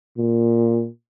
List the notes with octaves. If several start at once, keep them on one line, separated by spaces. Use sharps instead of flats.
A#2